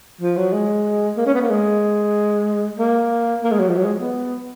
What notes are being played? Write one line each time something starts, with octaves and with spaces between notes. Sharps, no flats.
F3
F#3
G#3
A#3
C#4
B3
A#3
G#3
A#3
A#3
G#3
F#3
F3
F#3
G#3
B3